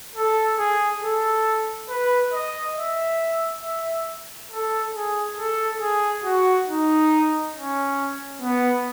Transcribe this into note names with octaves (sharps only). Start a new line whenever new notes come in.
A4
G#4
A4
B4
D#5
E5
E5
A4
G#4
A4
G#4
F#4
D#4
C#4
B3